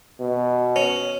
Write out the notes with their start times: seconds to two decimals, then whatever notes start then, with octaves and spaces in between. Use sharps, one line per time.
0.20 B2
0.76 C#4